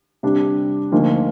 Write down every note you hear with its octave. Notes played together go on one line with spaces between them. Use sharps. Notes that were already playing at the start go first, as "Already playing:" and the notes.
C3 G3 D4
D2 D3 F3 A#3 D#4